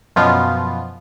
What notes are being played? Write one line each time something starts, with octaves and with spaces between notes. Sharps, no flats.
F#2 B2 F3 B3 F4